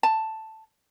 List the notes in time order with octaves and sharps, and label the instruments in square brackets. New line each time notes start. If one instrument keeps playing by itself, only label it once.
[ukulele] A5